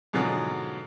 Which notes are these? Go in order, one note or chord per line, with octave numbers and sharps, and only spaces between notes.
G#2 B2 D3 F3 F#3